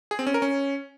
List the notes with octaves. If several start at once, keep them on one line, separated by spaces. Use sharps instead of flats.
G#4
C4
C#4
A#4
C#4